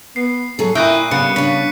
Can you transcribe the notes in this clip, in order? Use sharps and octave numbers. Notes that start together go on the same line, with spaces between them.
B3 C7
F#3 G#4 A4
A#2 E4 D#5 E5 G5 C#6 F#6 D#7
C#3 G3 B3 C#7
C#3 D4 B6